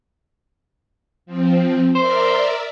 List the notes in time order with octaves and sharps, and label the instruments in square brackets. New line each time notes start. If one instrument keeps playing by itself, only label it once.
[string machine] F3 C4
[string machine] A#4 D5 E5 [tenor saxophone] C5